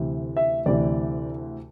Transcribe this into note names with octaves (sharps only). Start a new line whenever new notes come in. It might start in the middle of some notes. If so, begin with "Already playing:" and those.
Already playing: D2 C3 E3
E5
D2 C3 E3 D5